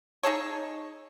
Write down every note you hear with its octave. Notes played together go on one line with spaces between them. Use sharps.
D#4 G#4 A4 C#5